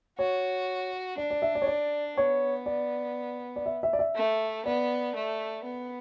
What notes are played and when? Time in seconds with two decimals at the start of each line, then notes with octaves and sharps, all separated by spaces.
0.18 F#4 C#5
1.18 D4 D5
1.31 D5
1.42 E5
1.55 D5
1.62 C#5
1.67 D5
2.17 B3 C#5
2.66 D5
3.56 D5
3.66 E5
3.83 E5
3.93 D5
3.99 E5
4.16 A3
4.66 B3 D5
5.15 A3
5.65 B3